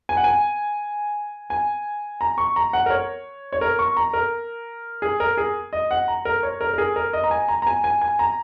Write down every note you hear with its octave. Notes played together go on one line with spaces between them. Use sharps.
G#5
F#5
G#5
G#5
A#5
C#6
A#5
F#5
A#4
C#5
C#5
A#4
C#6
A#5
A#4
G#4
A#4
G#4
D#5
F#5
A#5
A#4
C#5
A#4
A#4
G#4
A#4
D#5
A#5
G#5
A#5
A#5
G#5
G#5
G#5
A#5